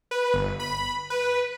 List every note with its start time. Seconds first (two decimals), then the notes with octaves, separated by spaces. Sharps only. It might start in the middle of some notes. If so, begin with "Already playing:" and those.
0.11 B4
0.34 G1
0.59 B5
1.10 B4